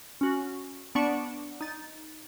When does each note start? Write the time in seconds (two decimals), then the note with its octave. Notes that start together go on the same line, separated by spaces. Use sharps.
0.21 C#4 F#4
0.95 B3 D4 D5 C#6 C#7 E7
1.61 D#4 A6